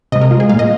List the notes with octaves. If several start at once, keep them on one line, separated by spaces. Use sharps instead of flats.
C3 G#3 D#5
A#4
F4
G#4
A#2 G#3 F5
D#5